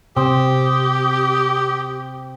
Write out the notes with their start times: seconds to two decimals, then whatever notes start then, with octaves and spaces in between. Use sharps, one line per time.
0.16 C3 C4 G4 D#6